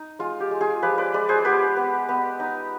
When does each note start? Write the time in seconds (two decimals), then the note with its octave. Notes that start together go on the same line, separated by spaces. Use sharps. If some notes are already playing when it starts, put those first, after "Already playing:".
Already playing: D#4
0.19 G#3 F4
0.40 G4
0.51 G#3
0.61 F4 G#4
0.82 F3 G4 B4
0.98 B4 D5
1.14 G#3 B4 D5
1.29 G#4 C5
1.45 B3 G4 B4
1.77 B3
2.09 B3
2.40 D#4